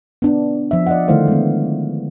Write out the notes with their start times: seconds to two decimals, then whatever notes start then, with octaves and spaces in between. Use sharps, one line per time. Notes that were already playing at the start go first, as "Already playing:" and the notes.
0.22 B3 D4
0.71 F3 E5
0.87 D5 D#5 F#5
1.08 D3 D#3 A3 E4 C5 F5
1.28 G#3 B3